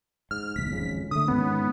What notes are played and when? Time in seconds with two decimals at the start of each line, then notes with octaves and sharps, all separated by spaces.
0.31 G#2 F6
0.56 D1 B1 B6
0.71 G#1 F2 C#3
1.11 D3 A3 D#6
1.28 G#2 D#3 B3 C#4